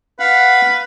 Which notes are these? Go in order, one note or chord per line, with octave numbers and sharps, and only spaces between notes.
B4 F5 F#5